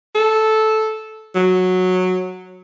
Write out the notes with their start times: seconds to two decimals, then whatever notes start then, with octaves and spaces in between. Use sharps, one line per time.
0.15 A4
1.35 F#3